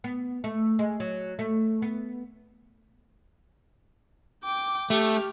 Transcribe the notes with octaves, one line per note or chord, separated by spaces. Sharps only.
B3
A3
G#3
F#3
A3
B3
G5 D6
A3 G4 F6